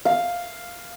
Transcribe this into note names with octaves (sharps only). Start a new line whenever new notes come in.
F5